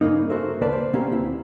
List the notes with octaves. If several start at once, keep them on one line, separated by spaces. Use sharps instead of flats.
G2 A#2 C#3 A#3 D#4
F#4 A4 A#4 C5 E5
D2 C#3 A#3 B4 D5 A5
C5
B2 A#3 C4 C#4 G4
D2 E4